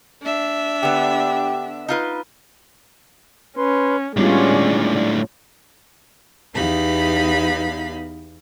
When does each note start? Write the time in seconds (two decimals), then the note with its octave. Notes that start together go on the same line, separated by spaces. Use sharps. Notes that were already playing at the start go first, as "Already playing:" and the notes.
0.22 D4 E5
0.83 D3 B3 G4
1.88 D#4 F4 B4
3.57 C#4 B4 C6
4.17 A2 G3 G#3 B3 C#4 D4 F4 D5
6.54 E2 B3 D#4 G4 F5 B5